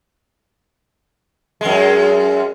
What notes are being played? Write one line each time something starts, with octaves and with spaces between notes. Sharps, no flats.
F#2 G#3